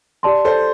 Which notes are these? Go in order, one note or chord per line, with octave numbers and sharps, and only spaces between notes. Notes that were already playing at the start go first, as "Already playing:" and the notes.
G4 D5 A5 C6
A4 C5